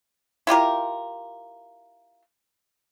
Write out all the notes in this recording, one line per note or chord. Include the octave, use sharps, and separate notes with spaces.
E4 F4 G4 A#4